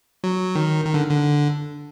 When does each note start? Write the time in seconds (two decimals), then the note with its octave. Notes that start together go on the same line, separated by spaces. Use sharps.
0.24 F#3
0.55 D#3
0.85 D#3
0.94 D3
1.11 D3